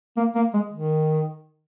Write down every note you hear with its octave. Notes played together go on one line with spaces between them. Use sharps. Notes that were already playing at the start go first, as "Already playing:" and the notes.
A#3
A#3
G#3
D#3